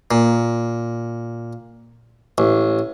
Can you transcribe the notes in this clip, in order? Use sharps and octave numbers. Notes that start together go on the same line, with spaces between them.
A#2
A1